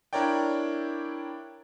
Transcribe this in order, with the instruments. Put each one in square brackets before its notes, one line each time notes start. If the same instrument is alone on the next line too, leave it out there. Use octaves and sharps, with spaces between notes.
[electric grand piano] D4 E4 A#4 C#5 D5 G5